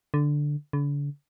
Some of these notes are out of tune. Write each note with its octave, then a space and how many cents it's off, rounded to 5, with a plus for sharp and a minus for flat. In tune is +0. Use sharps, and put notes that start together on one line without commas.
D3 +0
D3 -40